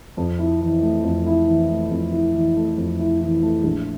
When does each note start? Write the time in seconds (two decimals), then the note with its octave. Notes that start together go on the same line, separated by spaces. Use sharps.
0.17 F2
0.39 E4
0.61 E3
0.82 A3
1.04 F2
1.26 E4
1.47 E3
1.69 A3
1.91 F2
2.12 E4
2.34 E3
2.56 A3
2.78 F2
2.99 E4
3.20 E3
3.43 A3
3.64 A#1